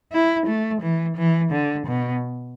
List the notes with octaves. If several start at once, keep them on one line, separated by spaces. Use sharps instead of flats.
E4
A3
E3
E3
D3
B2